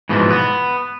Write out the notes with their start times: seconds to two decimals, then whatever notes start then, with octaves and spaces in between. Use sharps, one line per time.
0.09 G#2 B2 E3 F3
0.30 B3